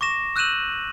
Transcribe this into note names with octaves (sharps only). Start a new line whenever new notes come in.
C#6 D6 A#6 E7
E6 F#6 G6 D#7 E7 F#7